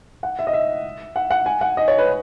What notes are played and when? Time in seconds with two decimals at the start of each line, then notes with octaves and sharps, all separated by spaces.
0.23 F#5
0.39 E5
0.47 D#5
0.53 E5
1.16 F#5
1.31 F#5
1.46 G#5
1.61 F#5
1.77 D#5
1.88 C#5
1.98 B4